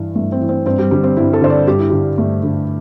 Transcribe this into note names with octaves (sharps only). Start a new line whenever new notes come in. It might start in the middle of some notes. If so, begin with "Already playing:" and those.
Already playing: G2 E3
G2 A3
C4
E3
C4
G2 C4
G3
D3 G3
C4
G2 E4
A4
D3 C5
D5
G2 G4
E4
D3 G4
G2 A3
D3